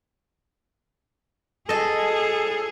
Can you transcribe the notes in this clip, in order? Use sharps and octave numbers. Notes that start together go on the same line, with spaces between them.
G#4 A4 D#5 A5